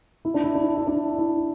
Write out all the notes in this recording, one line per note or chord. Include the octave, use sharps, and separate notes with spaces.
E4
D4
E4
D4
E4
D4
E4